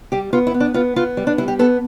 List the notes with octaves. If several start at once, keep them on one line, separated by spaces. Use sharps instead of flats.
G3 G4
B3 F4
E4
B3
D4
B3 F4
B3 F4
G3
D4
G3 E4
G4
B3 A4